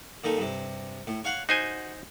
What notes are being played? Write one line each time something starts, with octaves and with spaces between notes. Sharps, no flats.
A#2 D#3 A3
G2 C3
A2
C#5 F5 F#5
D#4 F#4 C5 G#5